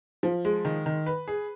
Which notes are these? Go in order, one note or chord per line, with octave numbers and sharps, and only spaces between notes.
F3
G#3
D#3
D#3
B4
G#4